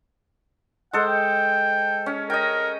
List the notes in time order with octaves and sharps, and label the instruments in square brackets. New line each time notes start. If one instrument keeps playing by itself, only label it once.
[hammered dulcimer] G#3 A4 C5 [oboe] F#5
[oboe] G5
[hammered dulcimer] C#4
[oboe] A#4 [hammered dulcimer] D#5 G5